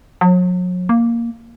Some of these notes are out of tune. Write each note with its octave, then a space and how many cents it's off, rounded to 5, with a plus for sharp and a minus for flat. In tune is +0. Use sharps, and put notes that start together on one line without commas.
F#3 -40
A#3 +0